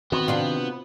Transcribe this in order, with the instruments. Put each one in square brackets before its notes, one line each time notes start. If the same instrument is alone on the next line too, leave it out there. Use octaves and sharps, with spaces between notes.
[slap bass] D#3 C4 [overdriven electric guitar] B3 [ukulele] F#4
[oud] C3 D4 F4